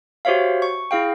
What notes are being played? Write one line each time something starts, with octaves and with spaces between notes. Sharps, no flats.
F#4 G4 C5 C#5 E5 F5
C#6
E4 G#4 F5 G5